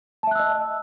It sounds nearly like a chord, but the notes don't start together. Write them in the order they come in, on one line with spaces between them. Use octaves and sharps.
A5 E5 F#6 E6 D#5